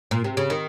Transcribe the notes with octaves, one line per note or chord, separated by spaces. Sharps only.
A#2
C3
C#3
D#3